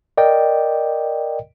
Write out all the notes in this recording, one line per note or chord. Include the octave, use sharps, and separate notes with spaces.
A#4 D5 D#5 G5